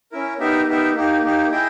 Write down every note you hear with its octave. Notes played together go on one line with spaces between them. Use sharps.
C#4 E4 A#4
B3 D#4 G4 A#4 E5
B3 D#4 G4 A#4 E5
A#3 D#4 G4
A#3 D#4 G4
E4 G#4 D#5 G5